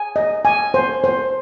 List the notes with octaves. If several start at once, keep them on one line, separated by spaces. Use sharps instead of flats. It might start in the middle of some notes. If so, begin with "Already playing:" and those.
Already playing: G#5
D#5
G#5
C5
C5